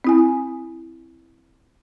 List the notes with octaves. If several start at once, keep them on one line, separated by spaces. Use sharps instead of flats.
C4 E4 G#5